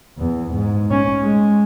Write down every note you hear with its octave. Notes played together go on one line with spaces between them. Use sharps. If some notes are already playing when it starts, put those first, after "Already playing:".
E2
G#2
C#4
G#3